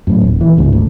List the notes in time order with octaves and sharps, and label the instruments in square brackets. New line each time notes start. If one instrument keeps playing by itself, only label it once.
[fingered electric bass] F#2 A2
D#1
E3
G#1 C#2 G#2
D2